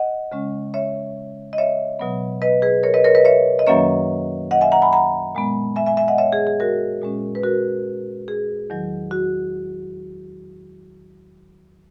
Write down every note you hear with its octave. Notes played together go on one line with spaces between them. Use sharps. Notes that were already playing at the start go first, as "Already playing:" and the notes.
Already playing: D#5 F#5
C#3 G#3 C#4
C#5 E5
D#5
C#5 E5
B2 F#3 B3
B4 D#5
G#4 B4
A#4 C#5
B4 D#5
A#4 C#5
B4 D#5
C#5 E5
D#5
F#2 D#3 F#3 A#3 C#4 C#5 E5
D#5 F#5
E5 G#5
F#5 A#5
G#5 B5
F#5 A#5
A#2 G#3 B3
E5 G#5
E5 G#5
E5 G#5
D#5 F#5
C#5 E5
G#4
G#4
F#4 A#4
A#2 G#3 C#4
B4
F#4 A#4
G#4
E2 D#3 F#3
F#4